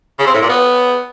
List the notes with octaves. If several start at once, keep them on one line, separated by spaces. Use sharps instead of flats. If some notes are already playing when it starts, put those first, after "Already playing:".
C#3
C4
A2
A#2
B3